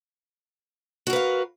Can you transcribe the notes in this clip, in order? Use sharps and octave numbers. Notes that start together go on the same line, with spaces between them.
F#4 A#4 B4 F5